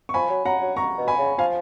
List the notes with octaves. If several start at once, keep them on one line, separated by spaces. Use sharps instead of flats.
C#6
F3 G#5 B5
F#3
F#3 F#5 A#5
F#3
A#5 C#6
B2
G#5 B5
C#3
F3 F5 G#5